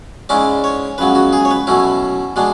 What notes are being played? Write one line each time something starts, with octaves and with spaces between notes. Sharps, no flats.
G#2 G#3 C#4 E4 D5
C#5
C#2 C#3 F#3 B3 B4
F#4
G#4
C#5
B4
B2 F#3 A3 C#4 E4
B2 G#3 D4